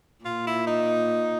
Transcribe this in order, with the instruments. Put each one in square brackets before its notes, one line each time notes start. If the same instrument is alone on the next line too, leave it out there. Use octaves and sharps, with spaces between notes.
[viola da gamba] A#2 [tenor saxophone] F4
[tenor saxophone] E4
D#4